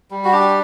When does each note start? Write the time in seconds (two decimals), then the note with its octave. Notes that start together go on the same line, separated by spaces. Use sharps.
0.11 G3
0.25 F#4
0.32 D4 G4